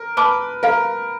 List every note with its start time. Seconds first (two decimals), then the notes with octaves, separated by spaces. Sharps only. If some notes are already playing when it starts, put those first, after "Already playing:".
Already playing: A#4
0.17 B4 A5 D6 F6
0.63 A#4 F5